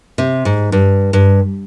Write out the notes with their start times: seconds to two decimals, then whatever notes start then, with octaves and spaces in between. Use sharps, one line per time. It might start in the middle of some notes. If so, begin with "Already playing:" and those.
0.18 C3
0.45 G#2
0.72 G2
1.13 G2